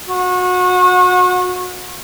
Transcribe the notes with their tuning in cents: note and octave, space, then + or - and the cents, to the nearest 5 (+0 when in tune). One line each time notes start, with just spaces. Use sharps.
F#4 -30